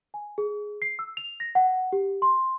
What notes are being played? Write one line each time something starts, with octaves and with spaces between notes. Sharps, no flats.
G#5
G#4
C7
E6
F7
A#6
F#5
G4
C6